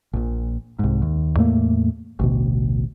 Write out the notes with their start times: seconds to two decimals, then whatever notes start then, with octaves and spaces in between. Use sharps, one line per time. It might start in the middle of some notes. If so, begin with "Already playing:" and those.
0.13 A#1 A#2
0.79 C2 G#2
1.02 D#2
1.36 E2 A2 A3 A#3
2.19 A1 D2 B2